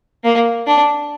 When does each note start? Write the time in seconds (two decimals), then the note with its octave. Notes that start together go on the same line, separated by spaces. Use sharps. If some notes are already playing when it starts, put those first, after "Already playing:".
0.24 A#3
0.67 D4